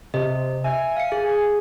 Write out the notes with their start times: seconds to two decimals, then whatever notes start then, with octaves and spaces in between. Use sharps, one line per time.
0.14 C3 D#5
0.64 E5 G#5
0.97 F5 C#7
1.12 G#4